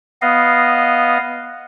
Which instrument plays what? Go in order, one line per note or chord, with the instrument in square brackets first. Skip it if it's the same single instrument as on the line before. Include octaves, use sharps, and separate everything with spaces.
[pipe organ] B3 D#5 F5